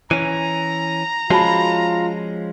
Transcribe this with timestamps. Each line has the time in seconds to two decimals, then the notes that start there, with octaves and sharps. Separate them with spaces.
0.11 E3 C#4 A#5 D#7
1.30 F3 G#3 C#4 F4 F#4 A5 B5